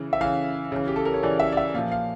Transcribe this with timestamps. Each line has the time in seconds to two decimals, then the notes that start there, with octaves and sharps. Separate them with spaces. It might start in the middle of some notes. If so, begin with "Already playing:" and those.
Already playing: C#3 E3
0.13 E5
0.21 C#3 E3 F5
0.72 C#3 E3
0.87 G4
0.96 A4
1.05 A#4
1.14 C#5
1.23 C#3 E3 D5
1.40 E5
1.52 D5
1.57 E5
1.74 A#2 F3 F5
1.92 F5